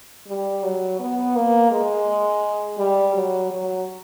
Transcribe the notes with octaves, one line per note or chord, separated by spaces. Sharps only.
G3
F#3
B3
A#3
G#3
G3
F#3
F#3